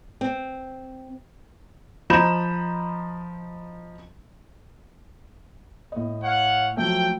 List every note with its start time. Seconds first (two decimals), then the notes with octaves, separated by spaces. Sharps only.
0.21 C4
2.10 F3 D#5 A#5 B5 G6 E7
5.92 A2 D#5
6.23 C#5 F5 F#5
6.77 F3 F#3 A3 G5